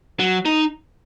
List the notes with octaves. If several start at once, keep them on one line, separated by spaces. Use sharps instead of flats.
F#3
D#4